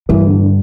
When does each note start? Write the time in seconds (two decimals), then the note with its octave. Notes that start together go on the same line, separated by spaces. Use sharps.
0.09 G2 E3
0.25 D3
0.40 D3